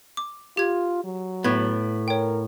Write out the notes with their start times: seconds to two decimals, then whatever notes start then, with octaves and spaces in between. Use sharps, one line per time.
0.17 D6
0.57 F4 G4 G#6
1.04 F#3
1.44 A2 B3 G#6
2.08 A#4 C#5 G5